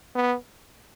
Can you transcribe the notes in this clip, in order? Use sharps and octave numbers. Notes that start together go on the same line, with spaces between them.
B3